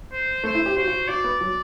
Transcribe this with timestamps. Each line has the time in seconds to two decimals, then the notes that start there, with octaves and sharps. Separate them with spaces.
0.12 C5
0.44 A3 C5
0.55 E4
0.66 G4
0.76 F#4 C5
0.88 F#4
1.08 F#4 D5
1.24 B3
1.41 F#3